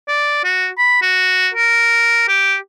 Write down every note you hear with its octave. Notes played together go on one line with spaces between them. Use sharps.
D5
F#4
B5
F#4
A#4
G4